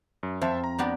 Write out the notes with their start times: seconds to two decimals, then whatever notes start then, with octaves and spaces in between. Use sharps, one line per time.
0.23 F#2
0.41 F2 C5 E5 A5
0.64 A#5
0.78 B3 D4 G4